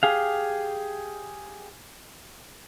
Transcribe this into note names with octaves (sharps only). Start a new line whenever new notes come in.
G4 G#4 F5